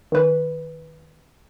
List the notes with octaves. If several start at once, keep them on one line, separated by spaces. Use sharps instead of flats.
D#3 B4